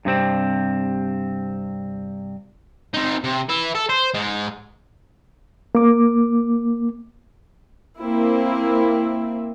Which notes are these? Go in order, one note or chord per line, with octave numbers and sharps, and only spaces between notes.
G2 C3 C4
C4 D#4
C3
B4 E5
A4
C5
G#2 G#3
A#3 D6
A#3 C4 E4